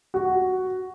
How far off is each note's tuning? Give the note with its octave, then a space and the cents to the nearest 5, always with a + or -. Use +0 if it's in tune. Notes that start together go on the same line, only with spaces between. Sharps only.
F#4 +5